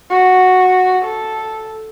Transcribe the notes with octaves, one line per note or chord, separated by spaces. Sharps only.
F#4
A4